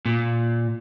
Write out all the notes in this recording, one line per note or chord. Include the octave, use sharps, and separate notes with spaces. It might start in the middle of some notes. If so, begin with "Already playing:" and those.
A#2